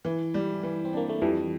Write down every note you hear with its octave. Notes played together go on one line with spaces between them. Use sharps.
E3
G3
E3
C4
A#3 D4
A3
F2 E3 G3